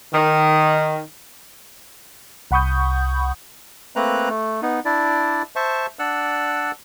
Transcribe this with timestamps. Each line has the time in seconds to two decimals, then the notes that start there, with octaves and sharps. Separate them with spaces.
0.13 D#3
2.51 C2 F#5 B5 C#6 D#6 G6
3.96 A3 A#3 C4 B4 A#5 F#6
4.30 A3
4.62 B3 D#4
4.85 D4 E4 D5
5.56 C5 E5 A5 C#6
5.99 D4 D5 F#5 E6 F#6